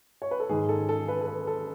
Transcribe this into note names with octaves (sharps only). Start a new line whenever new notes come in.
C#5
B4
A4
G#2 D#3 G#3 G#4
A4
A4
B4
A4
B4
A4